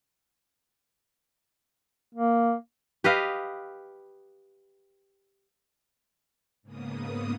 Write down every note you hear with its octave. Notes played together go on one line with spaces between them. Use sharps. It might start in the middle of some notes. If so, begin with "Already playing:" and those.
A#3
G4 B4 D#5 F5
G#2 C#3 A#3 B3 D#6